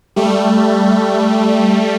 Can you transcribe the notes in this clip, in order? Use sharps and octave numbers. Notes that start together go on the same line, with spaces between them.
G3 A3